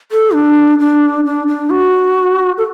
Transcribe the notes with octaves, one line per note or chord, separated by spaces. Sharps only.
A4
D4
D4
D4
D4
F#4
A4